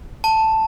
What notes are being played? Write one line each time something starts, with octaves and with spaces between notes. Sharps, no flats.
A5